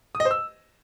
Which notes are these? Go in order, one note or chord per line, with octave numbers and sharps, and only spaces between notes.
D#6
D#5
C5
E6